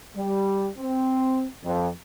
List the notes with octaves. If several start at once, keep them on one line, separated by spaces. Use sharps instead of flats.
G3
C4
F2